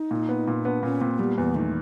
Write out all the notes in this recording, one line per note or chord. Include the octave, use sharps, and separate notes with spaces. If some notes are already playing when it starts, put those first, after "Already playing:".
Already playing: D#4
A#2
B3
A#2
B3 D4
A#2 C#4
A#2 C4
G3 B3
E2 B3
D#3 A3